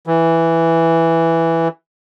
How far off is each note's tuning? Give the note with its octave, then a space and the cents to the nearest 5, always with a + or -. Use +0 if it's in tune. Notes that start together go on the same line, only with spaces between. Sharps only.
E3 +0